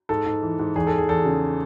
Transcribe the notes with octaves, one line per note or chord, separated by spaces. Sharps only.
G#2 A4
G#2
E3
G#2
E2 G#4
A4
E2
G#4
E2 A4
C#3